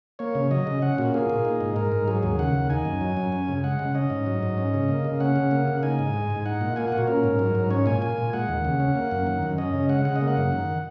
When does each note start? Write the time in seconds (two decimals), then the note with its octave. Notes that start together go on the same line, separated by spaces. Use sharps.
0.19 A#3 C#5
0.35 C#3
0.51 F#3 D#5
0.67 C#3
0.82 C#4 F#5
0.98 A#2 F#4
1.14 A#3 G#4
1.30 A#2
1.45 D#4
1.60 G#2
1.76 G#3 A#4
1.92 G#2
2.08 F#3 G#4
2.23 D#2 G#4
2.39 C#3 F#5
2.54 D#2
2.70 D#4 G#5
2.85 F#2
3.01 F#3
3.17 F#2
3.32 C#4
3.48 C#3
3.64 G#3 F#5
3.79 C#3
3.95 C#4 D#5
4.10 G#2
4.26 F#3
4.43 G#2
4.58 C#4
4.74 C#3
4.88 A#3
5.04 C#3
5.20 C#4 F#5
5.36 C#3
5.51 A#3
5.68 C#3
5.83 D#4 G#5
5.99 G#2
6.14 G#3
6.30 G#2
6.46 D#4 F#5
6.61 A#2
6.76 A#3 G#5
6.87 F#5
6.92 A#2
6.98 F#4
7.07 C#4 A#4
7.24 G#2
7.39 F#3
7.55 G#2
7.70 C#4 C#5
7.86 A#2 G#5
8.02 A#3 G#5
8.18 A#2
8.33 G#3 F#5
8.49 D#2
8.65 C#3
8.80 C#4
8.95 A#3
9.11 F#2
9.27 D#3
9.43 F#2
9.58 C#4 D#5
9.74 C#3
9.89 G#3 F#5
10.05 C#3 F#5
10.16 D#5
10.21 A#3
10.27 F#5
10.37 F#2
10.52 D#3